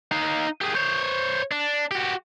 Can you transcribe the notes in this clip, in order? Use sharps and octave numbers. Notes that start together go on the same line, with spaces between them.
D#4 F5
G4 G#4
C5 C#5
D4
F#4 G4